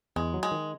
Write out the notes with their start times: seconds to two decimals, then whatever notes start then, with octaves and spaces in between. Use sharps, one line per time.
0.16 E2 G#3
0.34 F#3
0.43 G#3
0.51 D#3